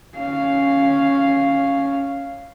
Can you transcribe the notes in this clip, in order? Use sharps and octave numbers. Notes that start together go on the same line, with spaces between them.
C#4 F5